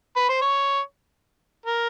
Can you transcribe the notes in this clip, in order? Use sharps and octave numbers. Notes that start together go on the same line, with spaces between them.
B4
C5
C#5
A#4